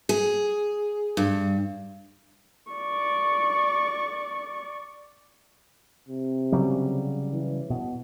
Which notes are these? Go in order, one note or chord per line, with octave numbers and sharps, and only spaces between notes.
G#4
G2
D5 C#6
C3
C#3 F#3 G3
E3
B2